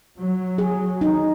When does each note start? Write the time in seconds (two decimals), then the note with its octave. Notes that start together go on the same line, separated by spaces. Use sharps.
0.21 F#3
0.58 G#4
1.01 D#4